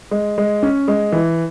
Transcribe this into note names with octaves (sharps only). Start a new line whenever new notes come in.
G#3
G#3
C#4
G#3
E3